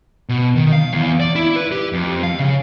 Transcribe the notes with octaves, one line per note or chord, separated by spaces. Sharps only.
B2
D#3
F5
E2
D5
E4
B4
G4
F2
F5
C#3